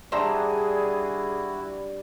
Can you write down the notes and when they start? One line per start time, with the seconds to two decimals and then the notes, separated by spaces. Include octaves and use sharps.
0.12 G3 D4 E4 F#4 G#4 C5 E5 A#5